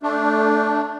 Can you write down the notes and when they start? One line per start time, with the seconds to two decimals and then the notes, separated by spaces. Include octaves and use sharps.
0.03 A3 D4